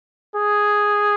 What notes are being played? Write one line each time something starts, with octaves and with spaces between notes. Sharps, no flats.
G#4